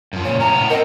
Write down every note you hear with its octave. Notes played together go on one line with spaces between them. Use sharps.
F#2 F3
A#2 C#3 C#5
A2 C#4 A#5
A2 B3
C4 A#4 D#5